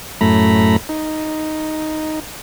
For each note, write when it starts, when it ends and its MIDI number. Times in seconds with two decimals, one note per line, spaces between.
0.21 0.76 42
0.21 0.76 45
0.21 0.76 57
0.21 0.76 82
0.21 0.76 83
0.89 2.20 63